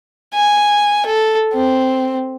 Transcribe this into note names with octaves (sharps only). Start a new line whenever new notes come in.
G#5
A4
C4